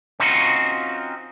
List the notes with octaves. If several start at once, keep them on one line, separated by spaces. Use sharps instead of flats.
C4 C#4 D#4 F4 F#4